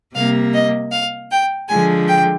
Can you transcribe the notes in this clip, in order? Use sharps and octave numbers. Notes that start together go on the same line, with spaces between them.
C3 G3 A#3 F5
D#5
F5
G5
D3 F3 G#3 G#5
G5